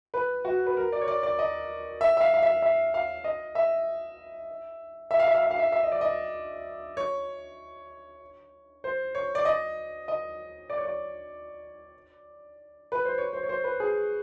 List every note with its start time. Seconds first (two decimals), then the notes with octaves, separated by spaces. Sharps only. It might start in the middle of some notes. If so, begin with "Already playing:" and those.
0.14 B4
0.45 F#4
0.67 B4
0.77 A#4
0.92 D5
1.01 C#5
1.08 D5
1.23 D5
1.39 D#5
2.01 E5
2.17 E5
2.21 F5
2.34 F5
2.42 E5
2.62 E5
2.94 F5
3.24 D#5
3.55 E5
5.11 E5
5.19 F5
5.28 E5
5.35 F5
5.43 E5
5.51 F5
5.59 E5
5.72 E5
5.83 D#5
5.92 D5
6.01 D#5
6.97 C#5
8.84 C5
9.15 C#5
9.35 D5
9.45 D#5
10.08 D#5
10.70 D5
10.78 C#5
10.85 D5
12.92 B4
13.05 C5
13.18 C#5
13.33 C5
13.43 C#5
13.49 C5
13.64 B4
13.80 G#4